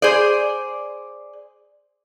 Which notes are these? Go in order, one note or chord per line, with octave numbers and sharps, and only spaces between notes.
G#4 C5 D5